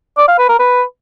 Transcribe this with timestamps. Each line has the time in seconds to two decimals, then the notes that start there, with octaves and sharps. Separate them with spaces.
0.18 D5
0.28 F5
0.39 B4
0.49 A#4
0.59 B4